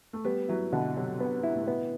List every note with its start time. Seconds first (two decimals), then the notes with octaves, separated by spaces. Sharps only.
0.13 A3
0.25 G3 B3
0.49 F#3 E4
0.73 B2 D3
0.96 C3 F#3
1.20 B3
1.43 E4
1.55 A2
1.67 B2 B3